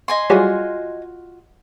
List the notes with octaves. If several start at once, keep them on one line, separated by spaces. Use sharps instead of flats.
D#5 G#5 C6
F#3 G3 F4 F#4 G#4